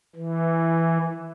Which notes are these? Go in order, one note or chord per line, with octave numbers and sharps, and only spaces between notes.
E3